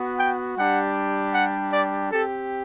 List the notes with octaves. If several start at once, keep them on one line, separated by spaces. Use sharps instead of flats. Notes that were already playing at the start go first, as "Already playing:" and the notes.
Already playing: B3 F#4
G5
G3 D4 G4 F#5
F#5
D5
C4 G4 A4